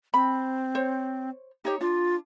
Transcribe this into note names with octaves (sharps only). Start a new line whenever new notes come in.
C4 B5
C5 C#5
D#4 G4 C#5
D4 F4